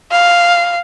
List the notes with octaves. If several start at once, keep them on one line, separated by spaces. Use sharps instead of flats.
F5